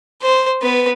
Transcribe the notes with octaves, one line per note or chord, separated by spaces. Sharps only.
C5
B3 B4